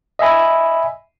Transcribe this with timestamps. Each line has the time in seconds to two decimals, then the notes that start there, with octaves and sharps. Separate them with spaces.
0.19 D#5 E5 G#5 B5